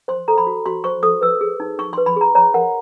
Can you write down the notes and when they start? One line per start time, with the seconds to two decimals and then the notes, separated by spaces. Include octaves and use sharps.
0.08 C5 C6
0.28 A4 A#5
0.38 B5
0.47 F#4
0.66 F#4 C6
0.84 C5 C#6
1.03 A4 D#6
1.21 B4 E6
1.41 G#4
1.60 D#4
1.79 D#4 C#6
1.93 C6
1.98 B4
2.06 B5
2.16 G#4 A#5
2.35 C#5 A#5
2.54 A#4 F#5